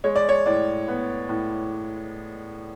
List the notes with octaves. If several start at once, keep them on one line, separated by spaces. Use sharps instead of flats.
G#3 C#5
D5
C#5
A2 D5
B3
A2